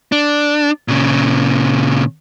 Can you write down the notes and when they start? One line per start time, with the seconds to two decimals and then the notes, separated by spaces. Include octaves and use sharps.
0.12 D4
0.88 A#2 C#3